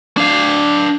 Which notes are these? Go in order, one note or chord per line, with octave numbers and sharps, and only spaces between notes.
D4 F5